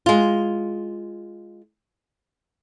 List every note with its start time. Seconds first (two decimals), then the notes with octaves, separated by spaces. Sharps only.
0.06 G#3 F4